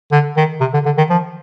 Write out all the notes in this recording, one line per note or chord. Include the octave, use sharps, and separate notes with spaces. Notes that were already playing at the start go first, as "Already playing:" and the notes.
D3
D#3
C3
D3
D3
D#3
F3